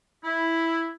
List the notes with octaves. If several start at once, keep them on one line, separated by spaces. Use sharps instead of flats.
E4